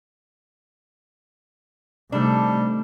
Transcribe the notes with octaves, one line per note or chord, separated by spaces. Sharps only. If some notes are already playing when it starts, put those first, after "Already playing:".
C3 D#3 G3 A3 D4 A4